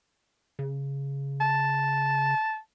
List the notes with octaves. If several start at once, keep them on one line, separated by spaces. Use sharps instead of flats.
C#3
A5